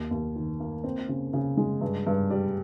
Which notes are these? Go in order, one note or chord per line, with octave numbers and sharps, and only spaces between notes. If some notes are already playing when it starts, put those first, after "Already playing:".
Already playing: D#2
D#2
D#3
A#3
C4
C#3
C#3
G#3
G2
G2
G3